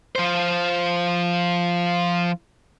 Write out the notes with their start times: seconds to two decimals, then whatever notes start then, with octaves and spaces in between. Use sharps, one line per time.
0.16 F3 C5